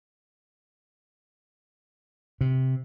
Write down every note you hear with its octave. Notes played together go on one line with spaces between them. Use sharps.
C3